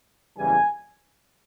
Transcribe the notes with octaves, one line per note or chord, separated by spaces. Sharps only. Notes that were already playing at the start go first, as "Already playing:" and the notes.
F#1 E2 C#3 E3 G3 G#5